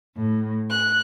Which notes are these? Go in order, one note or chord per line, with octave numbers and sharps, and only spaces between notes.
A2
F#6